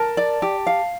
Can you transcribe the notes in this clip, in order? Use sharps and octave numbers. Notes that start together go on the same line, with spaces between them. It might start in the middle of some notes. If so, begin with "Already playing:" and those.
Already playing: A#4 A5
D5
G4
F5